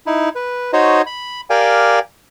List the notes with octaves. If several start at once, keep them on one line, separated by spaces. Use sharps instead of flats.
D#4 E4
B4
D#4 F#4 C5 C#5 D#5
B5
G4 A#4 D5 F5 G5 G#5